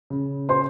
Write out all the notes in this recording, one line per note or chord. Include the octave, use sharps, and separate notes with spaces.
C#3
C5 C6